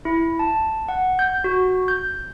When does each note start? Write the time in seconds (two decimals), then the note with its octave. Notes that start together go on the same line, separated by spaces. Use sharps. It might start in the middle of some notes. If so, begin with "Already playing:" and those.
0.05 E4
0.39 A5
0.88 F#5
1.19 G6
1.44 F#4
1.88 G6